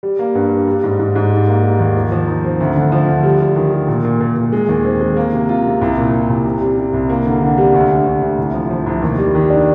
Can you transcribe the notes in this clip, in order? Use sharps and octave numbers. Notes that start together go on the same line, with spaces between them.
G3
A#3
G2
G3
G3
G#2
G#2
G#2
G3
A#3
G3
D#2
F3
F3
D#4
C4
D2
D3
F3
D2
G3
G3
D#3
G3
A#2
A#2
A#2
A#2
G#3
D#2
C4
G#3
A#3
C3
F4
C3
C2
A#2
C2
C2
C3
G3
C3
C2
A#3
D3
D3
G3
D2
D2
D2
D2
C2
F3
F3
C2
D#2
G3
D#3
D4